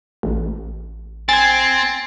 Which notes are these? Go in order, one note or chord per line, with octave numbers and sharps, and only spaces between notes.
A1
C4 G#5 G#6 A6